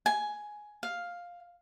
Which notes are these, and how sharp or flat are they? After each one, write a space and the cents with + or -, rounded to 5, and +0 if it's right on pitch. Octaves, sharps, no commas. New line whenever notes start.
G#5 +10
F5 +5